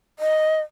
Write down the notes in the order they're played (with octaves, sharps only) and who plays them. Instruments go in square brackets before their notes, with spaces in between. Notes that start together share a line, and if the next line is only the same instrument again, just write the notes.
[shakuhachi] D#5